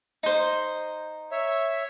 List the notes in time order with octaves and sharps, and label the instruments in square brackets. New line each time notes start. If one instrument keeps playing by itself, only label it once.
[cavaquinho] D#4 C5
[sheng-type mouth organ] C#5 E5